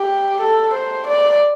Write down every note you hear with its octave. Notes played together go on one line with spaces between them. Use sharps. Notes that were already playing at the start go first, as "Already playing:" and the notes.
Already playing: G4
A4
C5
D5